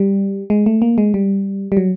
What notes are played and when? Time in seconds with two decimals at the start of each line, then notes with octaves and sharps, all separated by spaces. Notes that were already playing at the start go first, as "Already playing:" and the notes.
Already playing: G3
0.50 G#3
0.66 A3
0.82 A#3
0.98 G#3
1.14 G3
1.72 G3
1.77 F#3